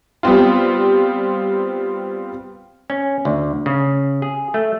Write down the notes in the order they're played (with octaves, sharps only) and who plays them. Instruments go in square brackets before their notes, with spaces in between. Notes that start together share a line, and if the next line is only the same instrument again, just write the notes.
[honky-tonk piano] G3 B3 C4 F4
[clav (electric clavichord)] C#4
D2
C#3
G#4
A3